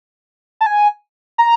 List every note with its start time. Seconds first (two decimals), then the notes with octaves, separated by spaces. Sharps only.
0.61 A5
0.66 G#5
1.38 A#5